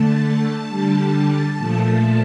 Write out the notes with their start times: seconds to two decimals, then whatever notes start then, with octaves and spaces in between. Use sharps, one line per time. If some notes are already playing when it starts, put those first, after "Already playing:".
Already playing: D3 A3 A5
0.69 D3 G3
1.58 A#2 F3 A3